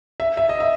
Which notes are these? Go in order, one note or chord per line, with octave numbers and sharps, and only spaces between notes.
E5
E5
D#5
E5